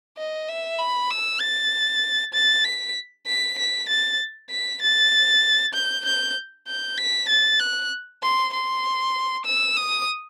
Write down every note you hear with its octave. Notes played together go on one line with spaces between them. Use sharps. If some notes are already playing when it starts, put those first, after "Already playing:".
D#5
E5
B5
E6
A6
A6
B6
B6
B6
A6
B6
A6
G6
G6
G6
B6
A6
F#6
C6
C6
E6
D#6